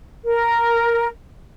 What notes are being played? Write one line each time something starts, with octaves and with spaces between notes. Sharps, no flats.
A#4